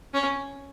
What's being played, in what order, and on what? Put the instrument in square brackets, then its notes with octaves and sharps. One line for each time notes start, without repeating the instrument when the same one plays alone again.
[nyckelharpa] C#4